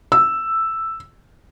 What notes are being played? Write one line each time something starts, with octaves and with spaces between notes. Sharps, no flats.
E6